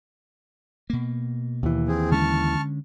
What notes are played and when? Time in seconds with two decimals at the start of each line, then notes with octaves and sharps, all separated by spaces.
0.90 B2 A#3
1.63 D#2 E3
1.88 C4 G#4
2.11 D3 G#3 C#4 A5 C#6 F6